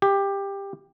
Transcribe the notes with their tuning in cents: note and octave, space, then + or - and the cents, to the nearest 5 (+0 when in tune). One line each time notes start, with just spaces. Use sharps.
G4 +15